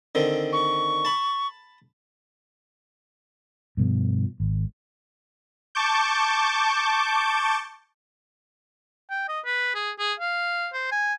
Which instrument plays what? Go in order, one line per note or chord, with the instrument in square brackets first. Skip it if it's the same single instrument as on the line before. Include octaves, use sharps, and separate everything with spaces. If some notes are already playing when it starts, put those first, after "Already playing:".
[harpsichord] D3 D#3 C4
[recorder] C#6
[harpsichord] A5 B5
[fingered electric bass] G2 B2 F3
G#1
[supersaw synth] A5 C#6 D6 G6
[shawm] G5
D#5
B4
G#4
G#4
F5
C5
G#5